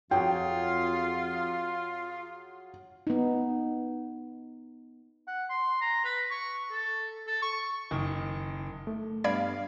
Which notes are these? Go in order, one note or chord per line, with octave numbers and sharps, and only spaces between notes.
F2 F#3 F4 F#4 G#4 G5
B3 D#4
F#5
C6
A#5
B4
C#6
A4
A4
C#6
F#1 D#3
A3
G2 B3 D5 F5 B5 G#6